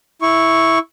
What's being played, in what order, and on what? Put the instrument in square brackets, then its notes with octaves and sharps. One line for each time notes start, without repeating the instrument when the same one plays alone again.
[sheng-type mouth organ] E4 C#6